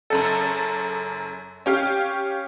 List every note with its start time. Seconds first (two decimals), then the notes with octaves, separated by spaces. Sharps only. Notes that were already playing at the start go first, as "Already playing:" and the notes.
0.10 F#1 F#2 A4
1.66 C#4 G4 F5